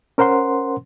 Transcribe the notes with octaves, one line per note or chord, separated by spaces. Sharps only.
C#4 A#4 C5 F#5 C6